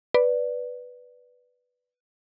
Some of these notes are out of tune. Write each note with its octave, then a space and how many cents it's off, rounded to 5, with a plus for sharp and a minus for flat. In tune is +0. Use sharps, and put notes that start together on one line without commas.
B4 +0 D5 +0